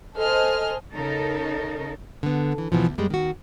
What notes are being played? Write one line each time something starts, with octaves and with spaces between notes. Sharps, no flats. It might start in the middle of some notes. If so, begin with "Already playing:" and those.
A4 C5 D#5 G#5 F6
C#3 D#4 A4 A#4
D3 B3
E3
D2 B2 E3 F3
D2
F#2 G3 G#3
D#3 F#4